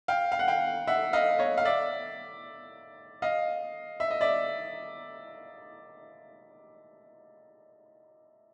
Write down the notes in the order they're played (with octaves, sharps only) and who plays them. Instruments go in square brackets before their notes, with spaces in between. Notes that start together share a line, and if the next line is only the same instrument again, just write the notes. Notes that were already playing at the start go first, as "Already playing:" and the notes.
[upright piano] F5 G5
F5
F#5
F5 G5
E5 F#5
D#5 F5
C#5 D#5
F5
D5 E5
D#5 F5
E5
D#5
D5 E5